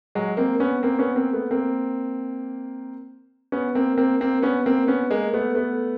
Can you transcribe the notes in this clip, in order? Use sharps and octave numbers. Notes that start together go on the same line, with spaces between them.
F#3 G#3
A#3 C4
B3 C#4
A#3 C4
B3 C#4
A#3 C4
A3 B3
A#3 C4
B3 C#4
A#3 C4
A#3 C4
A#3 C4
B3 C#4
A#3 C4
B3 C#4
G#3 A#3
A3 B3
A3 B3